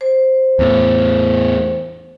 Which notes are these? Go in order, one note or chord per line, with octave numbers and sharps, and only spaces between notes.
C5
E2 A2